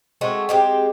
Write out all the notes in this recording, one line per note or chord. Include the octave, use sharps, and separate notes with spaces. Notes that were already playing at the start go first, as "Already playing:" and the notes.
G#3 A3 C4 F#4
G#3 C4 G4